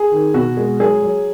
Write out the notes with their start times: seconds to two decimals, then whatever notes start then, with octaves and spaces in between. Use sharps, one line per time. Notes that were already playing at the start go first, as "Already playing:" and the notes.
Already playing: G#4
0.12 D#3
0.34 B2 F#4
0.57 G#3
0.80 F#3 G#4
1.03 F#3